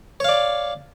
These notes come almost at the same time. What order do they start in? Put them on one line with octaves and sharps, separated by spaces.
C#5 F5 D5